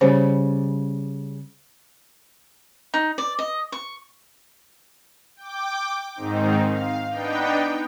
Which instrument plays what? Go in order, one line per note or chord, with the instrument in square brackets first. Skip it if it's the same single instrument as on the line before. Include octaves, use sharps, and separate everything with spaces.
[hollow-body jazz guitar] C#3 G3 [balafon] C5
[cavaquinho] D#4
D5
D#5
C#6
[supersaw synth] G5 D6
G#2 D#3 C4 D#4
F5
B3 D4 D#4 G5